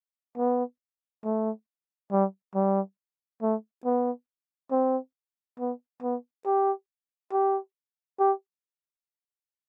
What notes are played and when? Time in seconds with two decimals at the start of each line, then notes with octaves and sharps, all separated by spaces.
0.38 B3
1.24 A3
2.12 G3
2.55 G3
3.42 A3
3.85 B3
4.71 C4
5.59 B3
6.02 B3
6.46 G4
7.32 G4
8.19 G4